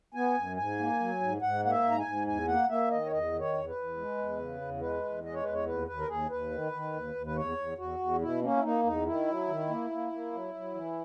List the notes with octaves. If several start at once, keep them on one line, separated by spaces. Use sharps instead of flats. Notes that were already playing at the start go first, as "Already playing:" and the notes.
B3 G#5
F#2
G#2 G#5
A#3
F#3
G#2
G#2 F#5
A#3 F#5
E5
G#2
A#5
G#5
G#2
E2 G#5
A#3 F#5
A#3 E5
D#3 D#5
C#5
E2 D#5
D#3
C#5
E2
B4
E2
G#3
E2
C#3
E2
G#3 B4
E2
G#3 D#5
C#5
E2 B4
C#5
D#2 B4
D#2 B4
A#4
D#2 G#4
D#2 B4
D#3
D#3
D#2
D#2
B4
E2 C#5
E2
E2 F#4
E2
B2 E4
A#3 C#4
E4
A#3 D#4
E2 D#4
D#3 E4
F#3
D#3
A#3
A#3
A#3
F#3
F#3
E3